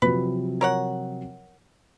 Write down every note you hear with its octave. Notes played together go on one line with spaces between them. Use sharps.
C3 F3 F#3 B4
A#4 C#5 F#5